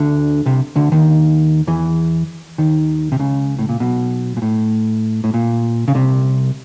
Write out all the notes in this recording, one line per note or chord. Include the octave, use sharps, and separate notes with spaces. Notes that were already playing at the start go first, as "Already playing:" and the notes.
Already playing: D2 D3
C2 C3
D2 D3
D#2 D#3
E2 E3
D#2 D#3
C3
C#2 C#3
A2
A#2
B1 B2
A#2
A2
A2
A#2
C#3
C2 C3